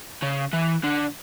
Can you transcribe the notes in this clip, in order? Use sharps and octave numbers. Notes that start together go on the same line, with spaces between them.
C#3
E3
D3